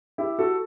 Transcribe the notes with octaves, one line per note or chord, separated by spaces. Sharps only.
E4 G4
F#4 A4